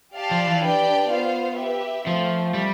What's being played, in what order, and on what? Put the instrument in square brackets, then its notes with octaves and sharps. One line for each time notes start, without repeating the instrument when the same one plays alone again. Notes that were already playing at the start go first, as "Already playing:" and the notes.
[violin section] G4 D5 F5 A5
[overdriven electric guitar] F3
E3
[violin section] D4 G4 B4 D5 G5
B3 F4 C5 F5
G4 B4 E5
[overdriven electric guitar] F3 [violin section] A3 C4 F4
[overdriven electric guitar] G3